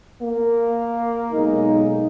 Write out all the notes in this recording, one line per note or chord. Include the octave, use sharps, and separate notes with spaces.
A#3
B1 G#3 D#4